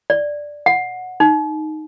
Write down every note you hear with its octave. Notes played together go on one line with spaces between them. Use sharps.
D5
F#5
D#4